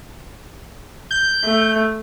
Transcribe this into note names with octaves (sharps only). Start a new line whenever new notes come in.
G6
A3